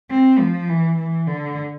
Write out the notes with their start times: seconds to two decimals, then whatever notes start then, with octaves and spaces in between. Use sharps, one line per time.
0.11 C4
0.39 F3
0.69 E3
0.98 E3
1.27 D3